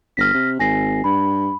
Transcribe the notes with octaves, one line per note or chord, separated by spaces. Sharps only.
G1 F6 A#6 B6
C3
G#1 G#5 A#6 C7
G2 B5